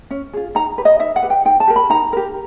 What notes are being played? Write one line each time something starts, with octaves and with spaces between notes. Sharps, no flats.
C#4
F4 G#4
D#4 A#5
G4 B4
D#5
D#4 E5
F#5
G4 B4
G5
D#4 G5
A5
G4 A#4
B5
D#4 A#5
G4 A#4